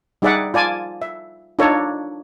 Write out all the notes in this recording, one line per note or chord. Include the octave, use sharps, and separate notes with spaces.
G3 D#4 G#4 D5 E5 F#5
F4 D5 G#5 A5
E5
D4 D#4 F4 A4 C#5